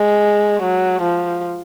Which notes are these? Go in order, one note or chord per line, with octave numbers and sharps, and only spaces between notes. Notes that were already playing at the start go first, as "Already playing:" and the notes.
Already playing: G#3
F#3
F3